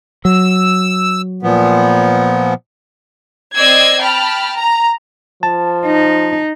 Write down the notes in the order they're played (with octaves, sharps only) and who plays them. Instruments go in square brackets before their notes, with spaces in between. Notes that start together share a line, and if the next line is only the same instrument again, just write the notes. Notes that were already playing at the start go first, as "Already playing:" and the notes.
[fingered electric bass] F#3 [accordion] E6
[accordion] A#2 F3 B3
[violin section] C4 D5 D#5 E6 G#6 C7
G5 A5 B5 F6
A#5
[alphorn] F3 [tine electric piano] A5
[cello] D#4